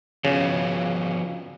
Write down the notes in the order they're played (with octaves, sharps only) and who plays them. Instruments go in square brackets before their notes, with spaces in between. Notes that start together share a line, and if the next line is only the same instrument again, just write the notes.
[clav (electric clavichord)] C#3 [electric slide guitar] F3 B3 F#4